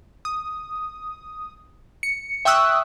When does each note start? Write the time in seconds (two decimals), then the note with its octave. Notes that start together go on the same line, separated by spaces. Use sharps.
0.25 D#6
2.03 C#7
2.45 E5 G5 C#6 D#6 E6 F#6